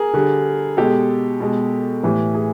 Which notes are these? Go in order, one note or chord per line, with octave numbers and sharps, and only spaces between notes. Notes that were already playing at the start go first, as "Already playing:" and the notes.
Already playing: G#4 A#4
D3 G3
B2 G#3 G4 A4
B2 G#3
A2 E3 G3
G#4